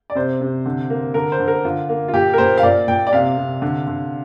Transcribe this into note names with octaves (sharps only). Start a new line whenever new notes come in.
D5
C3 C5
C3
D3
A#3
D3 A#4
C5
D3
A#4
D3 F4
A#3
F4
A#2 G4
A#4
A#2 C5
F5
A#2 D5
A#2 G5
D5
C3 F5
C3
D3
D3